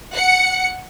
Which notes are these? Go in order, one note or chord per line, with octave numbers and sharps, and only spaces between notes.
F#5 C#7